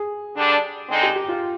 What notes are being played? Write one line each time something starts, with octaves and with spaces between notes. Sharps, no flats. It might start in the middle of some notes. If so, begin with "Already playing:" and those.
Already playing: G#4
D3 G3 D4
D3 G#3 C4 D#4
G4
G4
F4